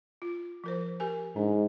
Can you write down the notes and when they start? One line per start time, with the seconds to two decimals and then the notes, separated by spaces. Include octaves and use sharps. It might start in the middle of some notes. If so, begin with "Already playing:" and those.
0.22 F4
0.64 F3 A#4 C5
1.00 G4 A#4 G#5
1.36 G#2 D4